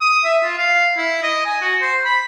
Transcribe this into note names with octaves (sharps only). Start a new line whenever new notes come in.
D#6
E5
F4
F5
E4
D#5
G#5
F#4
C5
B5